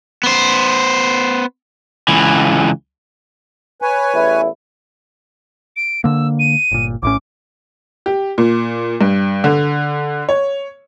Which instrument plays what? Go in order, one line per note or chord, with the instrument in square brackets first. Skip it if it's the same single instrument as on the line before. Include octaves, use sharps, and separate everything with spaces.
[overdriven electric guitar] B3 C5
C#2 E3
[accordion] B4 C#5 G#5
[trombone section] A1 E2 E4
[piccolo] D7
[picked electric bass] D3 A#3 [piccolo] E6
[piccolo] D#7
[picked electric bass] G1 A#2
[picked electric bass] A#1 A2 C#4 [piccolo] D6
[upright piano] G4
A#2
G2
D3
C#5